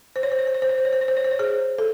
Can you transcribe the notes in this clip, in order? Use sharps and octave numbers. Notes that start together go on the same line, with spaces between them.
C5
C#5
C5
C#5
C5
C#5
C5
C#5
C5
C#5
C5
C#5
C5
C#5
C5
C#5
G#4 C5
A4